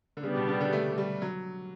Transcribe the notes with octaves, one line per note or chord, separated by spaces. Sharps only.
D3
C#3 G3 B3 D4 G4
B2
C#3
D3
A3
G3
F#3